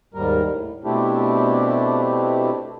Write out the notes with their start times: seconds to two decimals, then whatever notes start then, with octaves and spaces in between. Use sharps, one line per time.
0.14 D#2 G#2 G3 A#4
0.50 A2
0.84 B2 A3 C4 D4 E4 G4